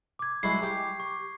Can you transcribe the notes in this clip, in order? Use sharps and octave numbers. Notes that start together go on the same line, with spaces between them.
D6 G#6
F#3 G#3 E4 C#6 C7
G4
C#6